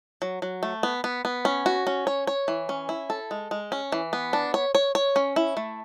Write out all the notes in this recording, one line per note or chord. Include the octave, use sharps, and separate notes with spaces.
F#3
F#3
A3
B3
B3
B3
C#4
F#4
C#4
C#5
C#5
E3
C#4
E4
A4
G#3
G#3
C#4
E3
B3
D4
C#5
C#5
C#5
C#4
E4
A3